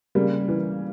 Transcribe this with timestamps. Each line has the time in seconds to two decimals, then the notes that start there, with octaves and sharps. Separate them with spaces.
0.15 C#3 G3 A#3
0.48 E3